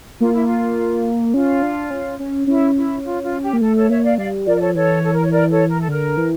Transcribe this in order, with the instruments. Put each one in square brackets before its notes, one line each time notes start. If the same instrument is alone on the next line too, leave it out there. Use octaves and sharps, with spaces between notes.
[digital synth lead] A#3 [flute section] F4
[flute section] E4
F4
[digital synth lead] C#4 [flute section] F4
[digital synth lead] D4
C#4
C#4
[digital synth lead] C#4 [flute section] E4
[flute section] E4
F4
F4
G4
[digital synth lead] A#3
[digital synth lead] A3 [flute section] A4
[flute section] A4 C#5
[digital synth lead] A#3 [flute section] C#5 E5
[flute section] D5 F5
[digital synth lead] G3 [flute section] D5 F5
[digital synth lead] F3 [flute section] A#4 D5
[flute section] D5
A4 C#5
[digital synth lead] E3 [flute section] A4 C#5
[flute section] A4
A#4
C#5
A#4 D5
A4 C#5
A#4
A4
[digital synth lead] D3 [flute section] A#4
[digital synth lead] E3